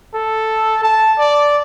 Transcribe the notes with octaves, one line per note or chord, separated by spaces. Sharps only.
A4
A5
D5